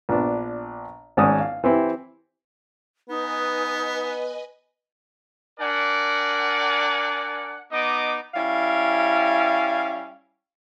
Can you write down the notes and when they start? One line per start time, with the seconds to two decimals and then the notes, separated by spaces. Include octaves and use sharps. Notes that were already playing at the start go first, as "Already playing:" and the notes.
0.09 A#1 B3 D4
1.17 G#1 G#2 C#4 D5 D#6
1.40 F5
1.64 E3 C4 E4 G4
3.09 B3 D#4 B4 D#5 G#5
5.60 D4 A#4 D5 F#5 G#5
7.72 B3 D#4 D#5 D6
8.35 G3 C#4 E4 F5